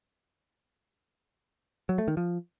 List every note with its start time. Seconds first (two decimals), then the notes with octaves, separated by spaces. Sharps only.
1.89 F#3
1.98 A3
2.08 D#3
2.17 F3